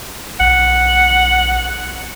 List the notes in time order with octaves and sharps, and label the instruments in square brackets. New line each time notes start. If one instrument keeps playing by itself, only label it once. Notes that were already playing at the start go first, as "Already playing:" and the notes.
[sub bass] B1 [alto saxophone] F#5